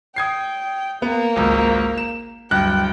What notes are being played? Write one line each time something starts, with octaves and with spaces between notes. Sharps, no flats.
G5 D#6 G#6 C7
A#3 B3
G#1 C#2
E7
D1 G2 G5 F#6